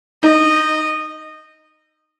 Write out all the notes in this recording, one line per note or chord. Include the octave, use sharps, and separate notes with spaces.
D#4 D#5